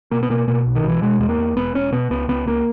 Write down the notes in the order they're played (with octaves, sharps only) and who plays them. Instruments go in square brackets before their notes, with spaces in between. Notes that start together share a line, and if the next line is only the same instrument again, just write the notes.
[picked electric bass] B2 A#3
B3
B2 A#3
B2 A#3
B1
D#3
B2 E3
B2 G#3
E2 G#3
A#3
E2
E1 B3
E1 C#4
B2 B3
C#2 B3
C#2 B3
C#2 A#3